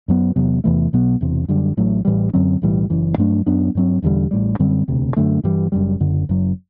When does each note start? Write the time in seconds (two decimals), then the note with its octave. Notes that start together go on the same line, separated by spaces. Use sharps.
0.08 F#2 F#3 B3
0.36 E2 C3 F#3 B3
0.64 E2 C3 E3 A3
0.93 B1 B2 F#3 B3
1.21 E1 E2 C3
1.48 F#2 D3 G3
1.77 A1 A2 F#3 A3
2.05 A1 A2 E3 G3
2.33 F#2 D3 F#3 C4
2.62 B1 A2 E3 G3
2.90 F#1 F#2 E3
3.18 G2 F#3 A3 D4
3.46 F#2 F#3 B3 D4
3.75 G2 F#3 C4
4.02 E1 E2 D3 G3
4.31 A1 A2 G3
4.59 F#2 D3 G3 C4
4.88 E1 D2 C3
5.16 F#2 D3 A3
5.44 G2 E3 G3
5.72 F#1 F#2 D3 G3
6.00 F#1 F#2 D3
6.29 F#1 F#2 F#3